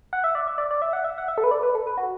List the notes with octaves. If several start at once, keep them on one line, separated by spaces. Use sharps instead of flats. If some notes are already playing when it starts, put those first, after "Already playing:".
F#5
E5
D5
E5
D5
D5
E5
F#5
E5
F#5
E5
A4
B4
D5
B4
A4
B4
F#4